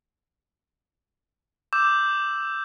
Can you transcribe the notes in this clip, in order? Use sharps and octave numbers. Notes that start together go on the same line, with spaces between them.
D6 E6 G6 E7